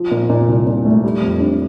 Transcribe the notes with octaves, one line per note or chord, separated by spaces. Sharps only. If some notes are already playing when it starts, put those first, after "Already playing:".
Already playing: F3
A#2
A#2
C2
A#2
A3
G3
F2
D4